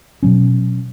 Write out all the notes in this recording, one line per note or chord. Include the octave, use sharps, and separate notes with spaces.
B2 F#3 C#4